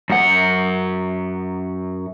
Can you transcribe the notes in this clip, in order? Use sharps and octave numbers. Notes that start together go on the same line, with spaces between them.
F#2 F#5